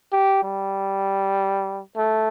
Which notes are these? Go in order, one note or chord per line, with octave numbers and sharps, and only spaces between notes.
G4
G3
A3